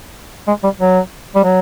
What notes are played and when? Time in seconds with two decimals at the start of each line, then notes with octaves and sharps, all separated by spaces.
0.48 G#3
0.64 G3
0.80 F#3
1.35 G3
1.44 F#3